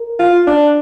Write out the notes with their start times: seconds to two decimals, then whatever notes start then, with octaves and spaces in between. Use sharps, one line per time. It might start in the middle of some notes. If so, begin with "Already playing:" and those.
Already playing: A#4
0.19 F4
0.47 D4